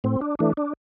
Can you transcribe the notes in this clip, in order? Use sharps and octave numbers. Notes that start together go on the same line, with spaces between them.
A2 C4
D4
E3 A3 D4
D4